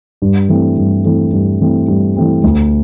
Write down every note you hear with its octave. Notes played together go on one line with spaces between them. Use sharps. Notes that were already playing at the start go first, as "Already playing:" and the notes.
G2
E3 A3 C4
G2
E3 A3 C4
G2
E3 A3 C4
G2
E3 A3 C4
D2